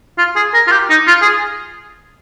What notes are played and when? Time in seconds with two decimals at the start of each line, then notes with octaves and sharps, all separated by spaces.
0.18 F4
0.36 G#4
0.54 A#4
0.68 F4
0.72 G4
0.90 D#4
1.08 F4
1.22 G#4